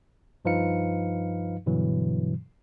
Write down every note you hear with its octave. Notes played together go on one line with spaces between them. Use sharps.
G2 F3 D#4 B4 F5 C#7
G2 B2 D3 E3 F#3